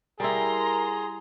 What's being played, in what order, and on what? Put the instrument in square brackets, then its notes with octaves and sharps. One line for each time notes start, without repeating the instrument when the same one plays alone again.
[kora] G3 E4 [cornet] G#4 [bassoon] A#4 [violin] A#5 C6